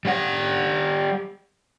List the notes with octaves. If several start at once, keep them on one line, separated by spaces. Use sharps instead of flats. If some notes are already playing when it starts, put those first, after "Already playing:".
G3 F#5